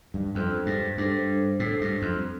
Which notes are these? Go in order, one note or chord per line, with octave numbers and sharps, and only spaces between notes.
G2
F2 G3 D4 A4 C5
G2
G2 G3 D4 A4 C5
A2 G3 D4 A4 C5
G2
F2
C4